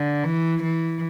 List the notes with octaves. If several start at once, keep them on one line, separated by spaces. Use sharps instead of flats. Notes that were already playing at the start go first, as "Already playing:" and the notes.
Already playing: D3
E3
E3